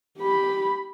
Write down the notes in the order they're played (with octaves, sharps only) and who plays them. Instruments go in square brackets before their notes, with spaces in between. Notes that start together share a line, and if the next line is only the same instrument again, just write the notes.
[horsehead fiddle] G4 B5